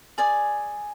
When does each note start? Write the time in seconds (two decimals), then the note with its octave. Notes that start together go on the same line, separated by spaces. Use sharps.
0.18 G#4 D5 G#5